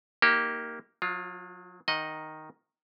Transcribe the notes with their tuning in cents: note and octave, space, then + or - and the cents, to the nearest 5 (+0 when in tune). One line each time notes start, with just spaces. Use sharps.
A#3 +0 D#4 +20 G4 -15
F#3 -35 F4 +0
D#3 +0 D#5 +0 F#5 -25